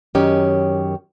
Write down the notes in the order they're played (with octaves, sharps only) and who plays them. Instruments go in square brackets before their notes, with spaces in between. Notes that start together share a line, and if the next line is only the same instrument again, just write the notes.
[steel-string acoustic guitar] F#2 D#3 C#4 G4 D#5